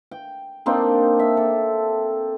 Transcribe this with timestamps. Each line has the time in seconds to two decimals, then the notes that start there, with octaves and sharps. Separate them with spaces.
0.11 G5
0.66 A#3 C4 D4 D#4
1.19 E5
1.37 A4